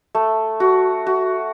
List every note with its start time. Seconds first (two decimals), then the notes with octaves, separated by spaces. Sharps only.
0.15 A3
0.60 F#4
1.07 F#4